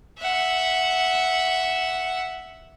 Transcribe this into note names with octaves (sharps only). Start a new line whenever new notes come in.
E5 F#5